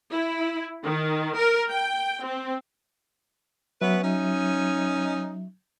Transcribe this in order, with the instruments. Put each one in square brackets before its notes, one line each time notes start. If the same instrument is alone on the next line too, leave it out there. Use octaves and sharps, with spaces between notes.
[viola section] E4
D#3
A#4
G5
C4
[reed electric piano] F#3 E5 [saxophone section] B3 C#4 B4
[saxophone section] C#4 D#4